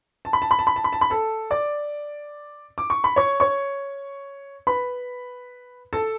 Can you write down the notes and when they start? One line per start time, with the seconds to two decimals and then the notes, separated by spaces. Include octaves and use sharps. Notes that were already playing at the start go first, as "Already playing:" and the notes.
0.25 A5
0.33 B5
0.42 A5
0.51 B5
0.59 A5
0.67 B5
0.76 A5
0.84 B5
0.93 A5
1.01 B5
1.10 A4 A5
1.51 D5 D6
2.78 D6
2.90 C#6
3.04 B5
3.16 C#5 C#6
3.40 C#5 C#6
4.67 B4 B5
5.93 A4 A5